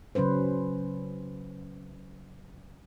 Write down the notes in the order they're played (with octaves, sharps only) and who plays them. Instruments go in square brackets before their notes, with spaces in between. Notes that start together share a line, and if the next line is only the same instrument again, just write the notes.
[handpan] C#3 F#3 C#4 B4 C5